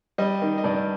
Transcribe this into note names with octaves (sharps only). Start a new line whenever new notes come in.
G3 D#5
D#3
D#5
G2 D5